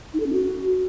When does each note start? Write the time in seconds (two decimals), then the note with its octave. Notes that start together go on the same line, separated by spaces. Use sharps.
0.14 D#4
0.20 A4
0.26 C#4
0.33 F#4